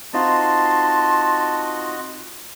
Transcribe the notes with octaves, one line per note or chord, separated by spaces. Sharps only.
C4 D#4 F4 F#4 D#5 A5 C6